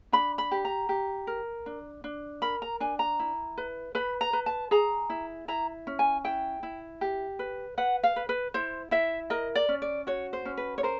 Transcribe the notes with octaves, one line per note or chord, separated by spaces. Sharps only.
D4 B5
B5
G4
A#5
G4
A#4
D4
D4
A#4 B5
A#5
D4 G#5
A#5
E4
B4
B4 B5
A#5
B4
A5
G#4 A#5
E4
E4 A#5
C#4
G#5
E4 G5
E4
G4
B4
B4 F#5
F5
B4
B4
E4 C5
E4 E5
A#4 D#5
D5
C#4
D5
F#4 C#5
C5
C#4
B4
C#5
A#4 C5